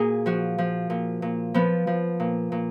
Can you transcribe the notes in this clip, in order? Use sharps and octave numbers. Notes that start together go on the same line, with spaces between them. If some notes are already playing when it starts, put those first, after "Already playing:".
Already playing: A#2 F#4 G#4 A#4
F3 F#4
F3
A#2
A#2
F3 B3
F3
A#2
A#2